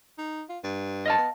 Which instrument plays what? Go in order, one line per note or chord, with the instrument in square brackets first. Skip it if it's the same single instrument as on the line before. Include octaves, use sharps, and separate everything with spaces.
[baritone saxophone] D#4
F4
G2
[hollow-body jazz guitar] D#5 F5 A5
[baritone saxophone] B3